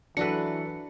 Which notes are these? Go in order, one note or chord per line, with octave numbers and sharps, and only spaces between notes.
E3 F#3 D4 F#4 A4 B4 C#7